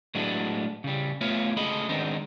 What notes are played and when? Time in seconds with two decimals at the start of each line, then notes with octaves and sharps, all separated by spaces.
0.15 A2 F#3 G#3 A3 B3 D4
0.84 C#3 G3
1.21 A3 B3 F4 C#5 E5 F5
1.57 D2 C#3 G#3 A4 D#5 B5
1.89 D#3 G#3 B3 C4 D4 D#4